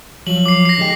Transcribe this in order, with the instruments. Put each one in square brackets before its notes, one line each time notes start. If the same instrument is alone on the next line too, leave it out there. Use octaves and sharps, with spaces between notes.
[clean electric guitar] F3 F#3 [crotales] F#7
[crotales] D6 C7
A#6 C7
[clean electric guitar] D3 G#3 G4